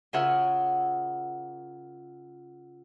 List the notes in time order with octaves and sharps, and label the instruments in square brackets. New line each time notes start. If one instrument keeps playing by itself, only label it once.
[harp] C#3 F4 G#4 A#4 E5 F#5